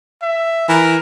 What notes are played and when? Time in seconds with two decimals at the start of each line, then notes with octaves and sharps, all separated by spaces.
0.22 E5
0.69 E3 A#4